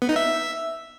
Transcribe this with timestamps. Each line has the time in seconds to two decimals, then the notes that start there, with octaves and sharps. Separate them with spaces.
0.02 B3
0.09 D#4
0.16 E5